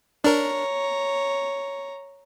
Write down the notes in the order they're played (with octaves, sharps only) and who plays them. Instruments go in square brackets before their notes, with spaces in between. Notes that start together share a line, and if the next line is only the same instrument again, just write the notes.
[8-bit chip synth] D4 A#4 [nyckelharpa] C#5 A#5